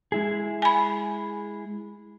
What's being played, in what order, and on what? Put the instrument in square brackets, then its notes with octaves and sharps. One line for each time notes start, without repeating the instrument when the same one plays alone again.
[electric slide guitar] G#3 E4 G#4
[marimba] G#5 B5